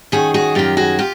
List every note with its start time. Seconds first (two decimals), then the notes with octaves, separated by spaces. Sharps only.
0.12 F#2 D#3 F#4 G#4
0.34 F#4 G#4
0.55 F#2 D#3 F4 G4
0.77 F#4 G#4
0.99 F4 G4